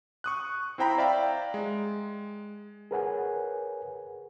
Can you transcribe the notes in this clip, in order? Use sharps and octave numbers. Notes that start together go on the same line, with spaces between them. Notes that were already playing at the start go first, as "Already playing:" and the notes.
C#6 D#6 F#6
C4 E4 C5 G5 A#5 B5
D5 E5 F5 G5 A#5
G#3
G#4 A#4 B4 C#5 F#5 G#5